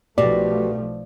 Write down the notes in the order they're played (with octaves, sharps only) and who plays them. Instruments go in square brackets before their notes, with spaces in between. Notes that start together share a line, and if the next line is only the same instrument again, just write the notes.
[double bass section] B1 F3 A3 [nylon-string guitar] B2 [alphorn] G4 [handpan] D5